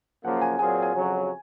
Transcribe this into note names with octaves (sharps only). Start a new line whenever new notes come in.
F#2 C#3 F3 A#3 F#5
G#5
A#2 F#3 C4 F4 G#4 G#5
G#5
F2 C#3 F#3